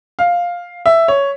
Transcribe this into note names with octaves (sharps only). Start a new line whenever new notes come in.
F5
E5
C#5